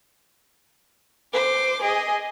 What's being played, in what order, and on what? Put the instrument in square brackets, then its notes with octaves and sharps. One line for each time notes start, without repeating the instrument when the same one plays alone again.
[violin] C5 D6
G#4 D#5